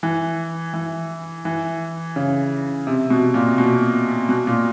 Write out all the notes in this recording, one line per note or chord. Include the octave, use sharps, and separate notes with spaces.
E3
E3
E3
C#3
C3
B2
A#2
B2
B2
A#2